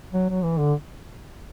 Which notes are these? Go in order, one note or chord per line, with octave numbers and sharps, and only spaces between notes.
F#3
F#3
E3
D3